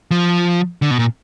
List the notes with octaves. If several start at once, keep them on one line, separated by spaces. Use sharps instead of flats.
F3
D3
B2
A#2